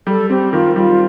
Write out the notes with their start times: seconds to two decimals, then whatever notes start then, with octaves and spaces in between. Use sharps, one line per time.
0.07 G3 A4
0.30 C4 G4
0.53 D#3 F4
0.76 G3 F4